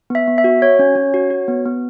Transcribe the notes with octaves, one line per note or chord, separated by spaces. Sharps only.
B3 E5
B3
E5
F#4
F#4 C#5
C#4
C#4
F#4
F#4
B3
B3